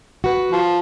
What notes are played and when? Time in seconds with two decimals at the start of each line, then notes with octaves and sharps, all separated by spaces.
0.24 F#4 B4
0.52 F3